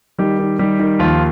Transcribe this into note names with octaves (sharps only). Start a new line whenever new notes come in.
D#3 G3 G4
D#3
D#3 G3 G4
D#3
D#2 F3 F4